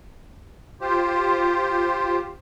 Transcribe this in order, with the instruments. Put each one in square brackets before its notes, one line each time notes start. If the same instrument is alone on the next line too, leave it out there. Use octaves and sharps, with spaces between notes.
[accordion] F4 G4 C5